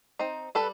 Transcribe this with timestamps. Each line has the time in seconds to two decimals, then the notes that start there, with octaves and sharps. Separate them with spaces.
0.19 C4 D#4
0.55 G3 A4 B4